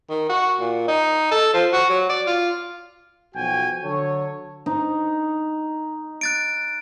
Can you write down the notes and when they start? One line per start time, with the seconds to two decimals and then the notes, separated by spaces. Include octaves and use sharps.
0.10 D#3
0.29 F#4
0.60 A#2
0.88 D#4
1.31 A4
1.53 F3
1.73 F#4
1.90 F#3
2.09 D5
2.27 F4
3.35 B1 F3 F#4 G5 G#5
3.84 D3 F#3 A4 C#5
4.66 D#4
6.21 F#6 A6 D7